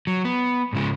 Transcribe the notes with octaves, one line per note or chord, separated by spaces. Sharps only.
F#3
B3
G#2 C#3 G#3